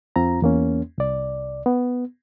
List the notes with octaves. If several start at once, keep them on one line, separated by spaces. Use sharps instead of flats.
F2 C4 F4 A#5
E2 A#3 C#4
C2 D5
B3